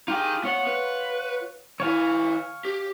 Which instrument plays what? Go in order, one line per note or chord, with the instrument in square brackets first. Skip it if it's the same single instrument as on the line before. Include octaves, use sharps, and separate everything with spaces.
[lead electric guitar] D#4 G5 [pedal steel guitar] F4 G4 G#4
[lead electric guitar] B3 [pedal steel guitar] F4 C#5 F#5
[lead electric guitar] B4
[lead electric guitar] D#3 E4 [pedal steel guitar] C#5 F5 G#5
[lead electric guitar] G4